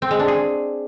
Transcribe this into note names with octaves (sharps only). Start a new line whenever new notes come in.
C4
G#3
D4
G#4